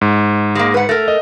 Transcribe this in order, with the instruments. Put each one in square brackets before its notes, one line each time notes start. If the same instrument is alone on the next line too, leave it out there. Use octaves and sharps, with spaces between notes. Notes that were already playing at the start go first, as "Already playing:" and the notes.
[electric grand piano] G#2
[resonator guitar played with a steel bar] G#3 A#3
B4 F#5
A3 A#4
[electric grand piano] D#5